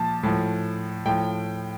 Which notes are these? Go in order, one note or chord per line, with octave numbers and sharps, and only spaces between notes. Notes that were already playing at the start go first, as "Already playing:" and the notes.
Already playing: A#2 F3 A5
A2 F3
A2 F3 G5